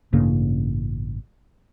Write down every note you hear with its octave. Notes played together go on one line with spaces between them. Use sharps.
A1 G2 C#3 A#3